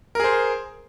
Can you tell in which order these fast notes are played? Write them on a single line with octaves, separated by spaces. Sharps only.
A#4 G#4 C5